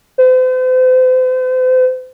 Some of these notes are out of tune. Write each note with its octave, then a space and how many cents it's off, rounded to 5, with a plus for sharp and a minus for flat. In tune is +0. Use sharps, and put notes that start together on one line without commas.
C5 -40